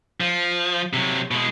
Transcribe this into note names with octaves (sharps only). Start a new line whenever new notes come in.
F3
C3 F#3
B2 G#3